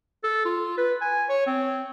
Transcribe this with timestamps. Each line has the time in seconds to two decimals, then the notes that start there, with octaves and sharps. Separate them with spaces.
0.23 A4
0.45 F4
0.78 B4
1.01 G#5
1.29 C#5
1.46 C4